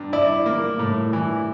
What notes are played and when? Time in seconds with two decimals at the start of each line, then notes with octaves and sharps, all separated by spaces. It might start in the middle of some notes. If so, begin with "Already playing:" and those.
Already playing: G2
0.13 E4 D5
0.46 A#3
0.79 A2
1.13 E3